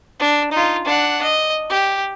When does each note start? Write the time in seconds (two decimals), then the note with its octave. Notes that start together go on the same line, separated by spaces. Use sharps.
0.20 D4
0.51 D#4 F4
0.84 D4 F#5
1.23 D#5
1.70 G4